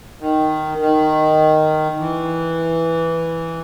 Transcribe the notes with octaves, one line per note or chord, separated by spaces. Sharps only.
D#3
D#3
E3